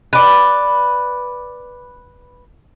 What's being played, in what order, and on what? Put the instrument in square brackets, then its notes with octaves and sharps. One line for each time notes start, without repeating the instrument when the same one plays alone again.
[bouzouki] B4 D5